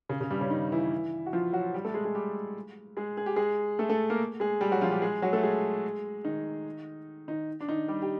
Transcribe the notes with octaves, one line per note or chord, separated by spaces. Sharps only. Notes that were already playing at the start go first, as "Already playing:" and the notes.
C#3
C#3
G2 G3
C#3 C#4
D#3 D#4
E3 E4
F#4
F3 F4
F#3 F#4
G3 G4
A3 A4
G#3 G#4
G#3 G#4
G3 G4
G#3 G#4
G#4
G4
G#3 G#4
A3 A4
A3 A4
A#3 A#4
G#3 G#4
G3 G4
F#3 F#4
F3 F4
G3 G4
G#3 G#4
F#3 F#4
A3 A4
G#3 G#4
D#3 D#4
D#3 D#4
D4
D#3 D#4
G3 G4
G4